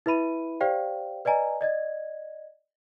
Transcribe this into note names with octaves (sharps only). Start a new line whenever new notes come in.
E4 B4 E5 B5 D#7
G4 C5 D5 F5 G5
B4 D5 D#5 G#5 A#5
D5 D#5 G#6